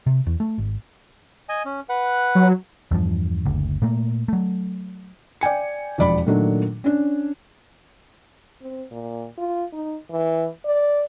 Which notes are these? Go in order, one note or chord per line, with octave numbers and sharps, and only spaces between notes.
C3
E2
A3
G#1
D#5 G#5
C#4
B4 F#5
F#3
E2 G2 F3
F#1 D2
A#2 A3 A#3
F#3 A3
D5 G5 G#5 C#7
E1 F2 D5 B5
A#2 D#3 F#3 A3 D4
C#4 D4
C4
A#2
F4
D#4
E3
D5